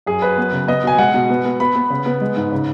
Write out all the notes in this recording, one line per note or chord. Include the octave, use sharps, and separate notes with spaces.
F#2 G#4
F#2 B4
B3
C#3
B3 D#5
B2 G#5
G#3 F#5
B2
B3
B3
B3 B5
B3
C#3
B3
G#3
G#2
C#3